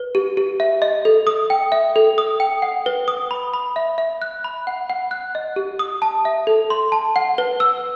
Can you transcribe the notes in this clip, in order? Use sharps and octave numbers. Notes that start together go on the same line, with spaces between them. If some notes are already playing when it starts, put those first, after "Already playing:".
Already playing: B4
G4
G4
E5
D#5
A4
D#6
G5
E5
A4
D#6
G5
F#5
B4
D#6
B5
B5
E5
E5
F#6
B5
F#5
F#5
F#6
D#5
G4
D#6
A5
E5
A4
C6
A5
F#5
B4
E6